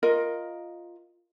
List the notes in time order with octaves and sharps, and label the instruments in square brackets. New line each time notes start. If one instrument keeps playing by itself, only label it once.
[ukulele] F4 A#4 D#5